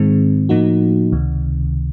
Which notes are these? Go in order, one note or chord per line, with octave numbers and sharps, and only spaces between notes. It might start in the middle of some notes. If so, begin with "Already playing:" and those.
Already playing: G#2 D#3 G#3 C4
A2 F3 A#3 D#4 F#4
C#2 C3 D#3